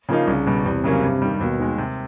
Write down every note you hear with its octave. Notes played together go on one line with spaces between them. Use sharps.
C#3 F3 A#3 D#4
C2 C#3
B2 G3
E2 C3
C#3 F#3 A#3 C#4
G2
D#3 G3
D#2 B2
D#3 G#3
C3